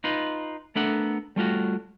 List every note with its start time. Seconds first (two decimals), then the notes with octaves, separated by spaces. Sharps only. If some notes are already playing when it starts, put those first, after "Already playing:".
0.04 D#4 F4 B4
0.75 A3 B3 D4 A4 A#4 F#5
1.36 G3 A3 F4 F#4